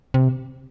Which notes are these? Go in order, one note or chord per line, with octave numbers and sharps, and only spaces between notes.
C3